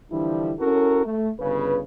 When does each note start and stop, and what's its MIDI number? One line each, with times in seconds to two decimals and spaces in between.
0.11 0.53 50
0.11 0.53 52
0.11 0.53 53
0.11 0.53 55
0.11 0.53 62
0.11 0.53 64
0.60 1.01 61
0.60 1.01 64
0.60 1.01 66
0.60 1.01 69
0.60 1.01 70
1.04 1.30 57
1.40 1.80 31
1.40 1.80 49
1.40 1.80 71